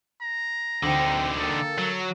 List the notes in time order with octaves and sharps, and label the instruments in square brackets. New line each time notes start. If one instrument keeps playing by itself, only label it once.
[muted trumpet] A#5
[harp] D2 [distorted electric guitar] D3 D#4 [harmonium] C4
[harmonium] A#3 [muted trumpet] A4 [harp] G5 D#6
[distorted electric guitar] F#3